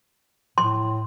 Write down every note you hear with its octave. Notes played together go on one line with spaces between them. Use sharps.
A2 C6